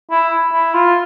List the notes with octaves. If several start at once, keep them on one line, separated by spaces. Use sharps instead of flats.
E4
E4
F4